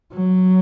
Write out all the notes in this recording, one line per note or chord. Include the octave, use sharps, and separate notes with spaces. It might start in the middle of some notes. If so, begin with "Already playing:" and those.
F#3